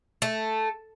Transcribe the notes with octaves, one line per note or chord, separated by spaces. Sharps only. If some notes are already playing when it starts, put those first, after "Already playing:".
A3